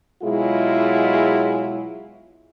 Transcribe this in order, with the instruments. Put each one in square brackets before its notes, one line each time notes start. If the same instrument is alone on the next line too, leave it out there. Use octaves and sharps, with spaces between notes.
[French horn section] B2 F#3 G#3 E4 F4 G#4